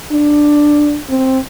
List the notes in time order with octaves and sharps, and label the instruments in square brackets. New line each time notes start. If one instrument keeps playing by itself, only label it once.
[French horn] D4
C4